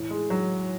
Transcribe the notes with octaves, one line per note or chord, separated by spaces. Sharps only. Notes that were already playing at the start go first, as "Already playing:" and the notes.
Already playing: A2 E3
G#3
F#3